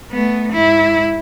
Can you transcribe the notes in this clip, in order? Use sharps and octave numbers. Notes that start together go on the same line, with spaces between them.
A3 B3
G#2 E4